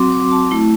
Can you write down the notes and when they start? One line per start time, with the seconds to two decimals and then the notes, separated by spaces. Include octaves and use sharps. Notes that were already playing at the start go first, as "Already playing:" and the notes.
Already playing: F#3 C4 F#4 C6 D6
0.12 D6
0.32 A5
0.51 A3 E4